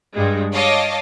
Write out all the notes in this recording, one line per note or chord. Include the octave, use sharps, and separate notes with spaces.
G2 G3 G#3
C#5 D#5 F5 A5 D6